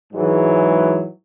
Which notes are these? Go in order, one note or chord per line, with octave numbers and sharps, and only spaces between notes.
G#2 E3 F#3 G#3